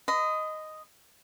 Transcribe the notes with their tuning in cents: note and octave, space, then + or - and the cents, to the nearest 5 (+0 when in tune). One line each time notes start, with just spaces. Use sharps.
D#5 +0 B5 +45